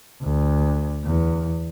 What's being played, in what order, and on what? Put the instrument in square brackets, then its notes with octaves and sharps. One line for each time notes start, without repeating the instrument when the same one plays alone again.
[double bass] D2
E2